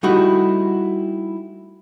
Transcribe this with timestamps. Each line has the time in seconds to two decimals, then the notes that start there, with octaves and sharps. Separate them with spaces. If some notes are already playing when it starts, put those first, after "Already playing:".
0.03 G3 A3 D#4 E4 F#4